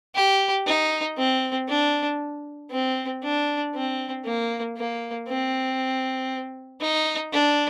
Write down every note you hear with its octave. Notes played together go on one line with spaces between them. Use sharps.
G4
D#4
C4
D4
C4
D4
C4
A#3
A#3
C4
D#4
D4